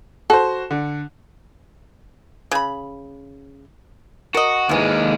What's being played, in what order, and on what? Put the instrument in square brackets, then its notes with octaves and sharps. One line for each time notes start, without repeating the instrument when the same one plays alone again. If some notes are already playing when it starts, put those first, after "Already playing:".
[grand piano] F#4 C5 [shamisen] A4
[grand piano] D3
[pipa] C#3 B5
[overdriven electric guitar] F#4 [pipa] A#4 D#5
[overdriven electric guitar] D#2 G#3 [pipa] C3 E3